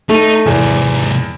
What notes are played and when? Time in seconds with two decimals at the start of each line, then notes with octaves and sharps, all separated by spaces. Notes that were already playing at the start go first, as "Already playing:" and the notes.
0.09 A3 D#4
0.46 E2 G#2 C3